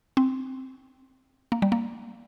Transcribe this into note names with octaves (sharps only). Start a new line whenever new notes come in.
C4
A#3
G3
A#3